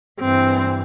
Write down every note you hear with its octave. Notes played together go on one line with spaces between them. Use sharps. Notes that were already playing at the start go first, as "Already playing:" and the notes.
G2 E3 C4